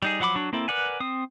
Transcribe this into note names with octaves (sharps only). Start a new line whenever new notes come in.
G3 D#4 G#4
F3 F#3 F#5 B5 D6
F#3 D4 F#4
A#3 C4 E4 A4
A#4 B4 D5 F#5 G#5
C4 D#6